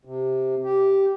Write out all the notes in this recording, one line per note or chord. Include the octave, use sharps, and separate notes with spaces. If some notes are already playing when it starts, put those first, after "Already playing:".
C3
G4